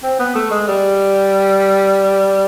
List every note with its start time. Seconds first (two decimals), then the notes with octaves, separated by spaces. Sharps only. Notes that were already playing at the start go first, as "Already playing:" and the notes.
0.03 C4
0.19 B3
0.35 A3
0.51 G#3
0.68 G3